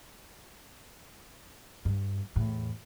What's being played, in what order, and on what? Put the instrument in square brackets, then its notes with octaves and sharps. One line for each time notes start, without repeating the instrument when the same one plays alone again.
[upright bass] G2
E2 A2